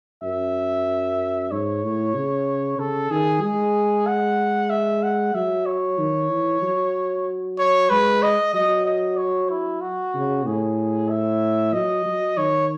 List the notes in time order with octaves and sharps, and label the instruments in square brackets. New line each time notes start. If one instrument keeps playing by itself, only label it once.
[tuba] F#2 [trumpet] E5
[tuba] G#2 [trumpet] C#5
[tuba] A2
C#3
[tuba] C#3 [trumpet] A4
[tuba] D#3 [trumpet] G#4
[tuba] G#3 [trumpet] G#4
[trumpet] F#5
E5
F#5
[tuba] F#3 [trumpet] E5
[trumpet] C#5
[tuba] D#3
E3
F#3
[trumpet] C#5
[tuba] G#3 [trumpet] B4
[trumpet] D#5
[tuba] F#3 [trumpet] D#5
[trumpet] D#5
C#5
E4
F#4
[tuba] C#3
[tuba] A2 [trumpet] G#4
[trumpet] E5
[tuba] F#3 [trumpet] D#5
[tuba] F#3
[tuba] D#3 [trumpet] C#5